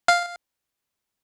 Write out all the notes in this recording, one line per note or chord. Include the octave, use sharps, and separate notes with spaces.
F5